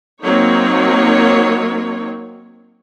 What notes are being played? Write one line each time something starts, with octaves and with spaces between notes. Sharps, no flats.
F#3 A#3 C4 D#4 C#5